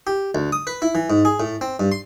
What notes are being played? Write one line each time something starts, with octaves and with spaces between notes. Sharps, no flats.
G4
D2
D#6
B4
E4
E3
G#2
G#4
A2
C4
G2
C6